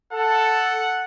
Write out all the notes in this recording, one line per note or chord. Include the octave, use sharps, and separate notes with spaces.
A4 F#5